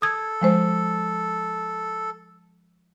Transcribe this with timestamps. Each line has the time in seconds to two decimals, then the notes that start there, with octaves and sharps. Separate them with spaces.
0.02 A4 D#6 G#6
0.41 F3 G#3 C5